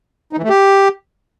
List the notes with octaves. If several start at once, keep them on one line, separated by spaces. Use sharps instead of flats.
D#4
E3
A3
G4